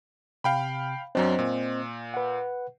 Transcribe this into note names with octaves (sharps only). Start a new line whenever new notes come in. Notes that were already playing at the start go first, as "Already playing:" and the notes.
C3 F5 G5 B5
F#2 F#3 C4 D4 C5 D#5
A#2
B4 F#5